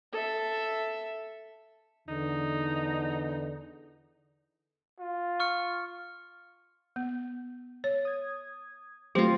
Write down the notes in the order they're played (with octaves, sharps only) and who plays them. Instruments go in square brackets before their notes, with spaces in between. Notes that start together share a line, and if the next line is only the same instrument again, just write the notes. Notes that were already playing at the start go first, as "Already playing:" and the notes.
[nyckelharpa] A4 E5
[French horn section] E2 D3 [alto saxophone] D#4
[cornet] F4
[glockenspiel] C#6 F6 C#7
[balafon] B3
C#5
[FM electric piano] D#6 G#6
[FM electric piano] F#3 A3 A#6 [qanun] C4 F4 [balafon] G4